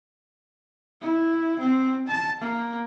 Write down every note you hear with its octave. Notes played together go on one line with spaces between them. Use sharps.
E4
C4
A5
A#3